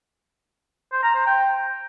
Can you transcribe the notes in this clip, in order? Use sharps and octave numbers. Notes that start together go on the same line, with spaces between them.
C5
A#5
C5
G5